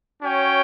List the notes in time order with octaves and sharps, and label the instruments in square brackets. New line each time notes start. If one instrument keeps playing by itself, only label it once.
[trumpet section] C#4 F#4 C#5 G5